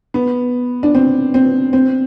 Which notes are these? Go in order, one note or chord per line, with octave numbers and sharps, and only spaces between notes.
B3
D4
C4
C4
C4